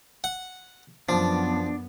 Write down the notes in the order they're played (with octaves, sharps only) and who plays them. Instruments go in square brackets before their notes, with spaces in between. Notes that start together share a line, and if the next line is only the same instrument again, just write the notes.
[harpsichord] F#5
[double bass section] F#2 B3 [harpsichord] F3 [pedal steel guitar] D4